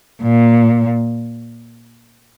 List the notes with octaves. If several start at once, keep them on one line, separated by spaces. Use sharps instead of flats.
A#2